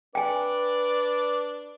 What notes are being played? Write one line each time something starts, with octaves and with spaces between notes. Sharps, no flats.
D4 B4 D5 G5 G#5